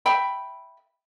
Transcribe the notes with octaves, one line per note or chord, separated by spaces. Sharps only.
E5 G5 B5